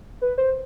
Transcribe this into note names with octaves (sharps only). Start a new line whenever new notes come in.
B4
C5